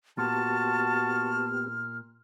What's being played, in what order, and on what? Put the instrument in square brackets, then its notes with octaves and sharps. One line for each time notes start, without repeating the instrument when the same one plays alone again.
[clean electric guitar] A#2 [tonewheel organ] B3 G4 [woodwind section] F#4 A5 [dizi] F6